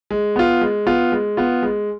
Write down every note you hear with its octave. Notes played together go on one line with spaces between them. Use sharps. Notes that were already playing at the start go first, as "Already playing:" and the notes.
G#3
B3 F4
G#3
B3 F4
G#3
B3 F4
G#3